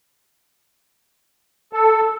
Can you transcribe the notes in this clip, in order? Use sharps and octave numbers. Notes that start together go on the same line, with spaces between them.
A4